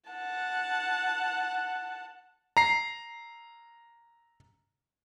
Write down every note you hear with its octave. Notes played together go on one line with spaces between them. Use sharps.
F#5 A5
A#5 C7